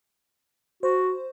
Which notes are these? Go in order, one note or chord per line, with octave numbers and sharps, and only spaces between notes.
F#4 C5